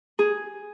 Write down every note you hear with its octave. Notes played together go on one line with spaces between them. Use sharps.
G#4